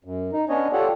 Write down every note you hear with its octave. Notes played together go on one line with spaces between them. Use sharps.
F#2
D#4
B3 C#4 D4 C#5 D#5
F4 G4 A4 C#5 D5 F#5